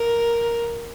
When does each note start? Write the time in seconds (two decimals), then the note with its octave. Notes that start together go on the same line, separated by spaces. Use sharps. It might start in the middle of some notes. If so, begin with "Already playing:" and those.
Already playing: A#4